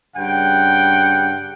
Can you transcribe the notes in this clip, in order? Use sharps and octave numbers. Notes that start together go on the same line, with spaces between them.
G2 C#3 F#5 G5